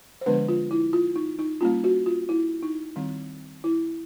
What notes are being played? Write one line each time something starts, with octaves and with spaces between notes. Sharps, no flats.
C5
D3 F3 G#3 B3 D4 B4
F4
E4
F4
D#4
D#4
G3 A#3 C#4 F4
F#4
F4
E4
D#4
D#3 G3 C4
E4